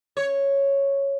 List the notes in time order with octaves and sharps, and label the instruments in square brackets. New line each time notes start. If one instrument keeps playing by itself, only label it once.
[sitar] C#5